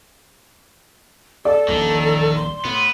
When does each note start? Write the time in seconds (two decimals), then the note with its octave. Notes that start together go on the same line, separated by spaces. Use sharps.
1.45 A4 D5
1.68 D#1 A#1 E2 D#3
2.36 C6
2.65 A2 B3